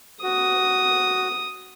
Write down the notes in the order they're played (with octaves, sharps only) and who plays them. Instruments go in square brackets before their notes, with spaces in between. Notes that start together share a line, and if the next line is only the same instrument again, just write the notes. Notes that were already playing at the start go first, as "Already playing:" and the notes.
[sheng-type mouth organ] F#4 [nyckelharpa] D#6